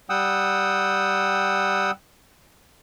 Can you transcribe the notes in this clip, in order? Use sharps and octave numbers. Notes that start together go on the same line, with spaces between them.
G3 F#5 G5 D#6 E6